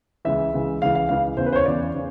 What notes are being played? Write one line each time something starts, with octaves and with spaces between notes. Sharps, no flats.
C#2 C#3 E3 E5
C#2 C#3 E3
C#2 C#3 E3 F5
F5
C#2 C#3 E3 F5
E2 C#3 E3 C5
B4
C5
C#5
E2 C#3 E3 D5
C#3